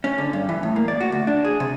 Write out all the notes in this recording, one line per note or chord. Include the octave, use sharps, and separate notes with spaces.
C#4
D3
G2
E3
A2
A#3
D5
F#4
D2
D4
G#4
C3